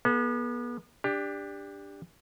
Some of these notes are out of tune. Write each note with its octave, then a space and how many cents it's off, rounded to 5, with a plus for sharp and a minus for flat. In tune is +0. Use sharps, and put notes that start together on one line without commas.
B3 -35 G#4 +45
D4 +0 G4 +20